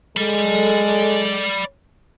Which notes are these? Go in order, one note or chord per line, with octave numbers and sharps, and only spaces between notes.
G#3 A4 D5 B5